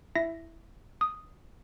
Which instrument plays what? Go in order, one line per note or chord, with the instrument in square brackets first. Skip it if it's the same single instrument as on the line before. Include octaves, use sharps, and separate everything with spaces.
[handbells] E4 E5 A#6
D#6